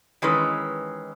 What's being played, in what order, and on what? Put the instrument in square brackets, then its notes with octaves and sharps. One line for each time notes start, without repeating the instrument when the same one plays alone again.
[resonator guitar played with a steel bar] D#3 E3 G#3 C#4 B4